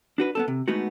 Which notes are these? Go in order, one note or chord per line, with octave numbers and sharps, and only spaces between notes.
D4 F#4 B4
B3 C4 A4
C3
G#3 A3 B3 D#4 F#4